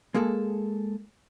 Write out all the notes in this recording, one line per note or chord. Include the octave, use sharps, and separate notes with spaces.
G#3 A#3 G#4 A4